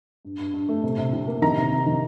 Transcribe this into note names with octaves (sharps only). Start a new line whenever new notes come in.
G2
G2
G2
A3
C3
C3
G3
A#3
D#3 A#5
C3
C3
D#3